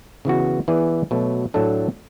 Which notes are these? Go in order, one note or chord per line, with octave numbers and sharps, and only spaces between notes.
C#3 E3 B3 F#4
E3 B3 E4 G#4 D5
B2 F#3 A3
A2 F#3 A3 D4 A4